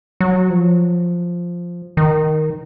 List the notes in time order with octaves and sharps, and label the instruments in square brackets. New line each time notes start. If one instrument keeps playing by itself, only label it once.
[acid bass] F#3
F3
D#3